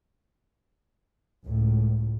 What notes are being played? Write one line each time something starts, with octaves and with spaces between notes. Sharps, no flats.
C#2 A2